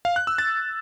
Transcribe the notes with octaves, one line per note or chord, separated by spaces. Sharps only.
F5
F#6
E6
A6